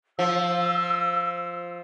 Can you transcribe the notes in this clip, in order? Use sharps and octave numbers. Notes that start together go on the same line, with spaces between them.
F3 E6